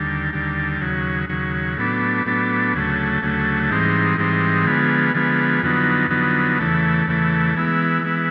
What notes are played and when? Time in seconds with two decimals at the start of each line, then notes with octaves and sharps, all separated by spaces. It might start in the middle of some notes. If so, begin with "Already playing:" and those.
Already playing: D#2 D3 G3
0.33 D#2 D3 G3
0.81 D#2 C#3 F#3
1.29 D#2 C#3 F#3
1.77 A2 F#3 B3 D4
2.26 A2 F#3 B3 D4
2.74 D2 C#3 F#3 A3
3.22 D2 C#3 F#3 A3
3.70 G#2 E3 G3 C4 D#4
4.18 G#2 E3 G3 C4 D#4
4.66 D3 F3 G#3 B3
5.15 D3 F3 G#3 B3
5.63 F2 D3 F#3 B3 D#4
6.10 F2 D3 F#3 B3 D#4
6.59 E2 C#3 E3 A3
7.07 E2 C#3 E3 A3
7.55 E3 G#3 B3 E4
8.02 E3 G#3 B3 E4